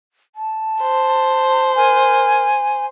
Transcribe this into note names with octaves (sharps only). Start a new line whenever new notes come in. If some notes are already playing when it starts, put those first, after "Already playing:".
A5
C5
A#4 G#5